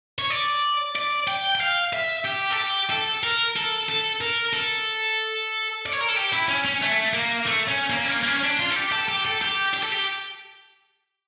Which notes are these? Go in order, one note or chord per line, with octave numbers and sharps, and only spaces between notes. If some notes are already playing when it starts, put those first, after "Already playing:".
C#5
D5
D5
G5
G5
F5
E5
G4
A4
G4
A4
A#4
A4
A4
A#4
A4
D5
C#5
A#4
A4
G4
E4
C#4
C#4
A3
A#3
A3
C#4
A#3
C#4
A#3
A#3
C#4
D4
F4
A4
G4
A4
G4
A4
G4
G4
A4
G4